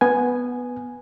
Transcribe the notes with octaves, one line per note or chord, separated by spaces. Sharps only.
B3 G#5